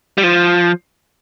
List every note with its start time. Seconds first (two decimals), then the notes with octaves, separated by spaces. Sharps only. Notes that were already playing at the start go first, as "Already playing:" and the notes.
0.18 G3
0.23 F3